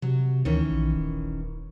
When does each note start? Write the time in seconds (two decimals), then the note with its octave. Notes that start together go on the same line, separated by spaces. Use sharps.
0.02 C3 F#3
0.45 D2 D#3 E3 C#4
0.71 A#1
0.94 D#1